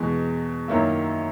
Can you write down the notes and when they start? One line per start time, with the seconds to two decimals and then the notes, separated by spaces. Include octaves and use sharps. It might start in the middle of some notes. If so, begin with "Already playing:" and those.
Already playing: E2 B2 G#3
0.68 F#2 D#3 F#3 A#3 E4